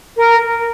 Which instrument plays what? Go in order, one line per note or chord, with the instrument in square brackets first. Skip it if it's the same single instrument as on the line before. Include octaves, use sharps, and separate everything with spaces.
[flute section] A#4